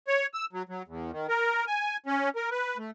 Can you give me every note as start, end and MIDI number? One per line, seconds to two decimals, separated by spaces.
0.08 0.26 73
0.34 0.46 88
0.53 0.63 54
0.69 0.82 54
0.88 1.11 40
1.11 1.27 51
1.28 1.65 70
1.67 1.97 80
2.06 2.29 61
2.36 2.50 70
2.51 2.77 71
2.77 2.91 57